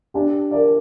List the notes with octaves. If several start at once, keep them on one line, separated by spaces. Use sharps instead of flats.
D4 G4
A#4 D5